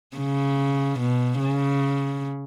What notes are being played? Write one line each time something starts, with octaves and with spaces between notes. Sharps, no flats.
C#3
B2
C#3